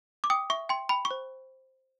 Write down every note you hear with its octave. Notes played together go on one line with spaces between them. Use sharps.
D6
G5 D#6
E5 C#6
G5 C6
G5 B5
C#6
C5